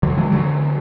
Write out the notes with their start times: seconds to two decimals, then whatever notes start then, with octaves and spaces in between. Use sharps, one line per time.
0.03 D3 F#3
0.18 E3 G#3
0.32 D3 F#3